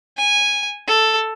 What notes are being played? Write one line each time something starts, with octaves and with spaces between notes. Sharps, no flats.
G#5
A4